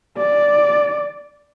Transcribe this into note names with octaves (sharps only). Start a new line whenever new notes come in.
D5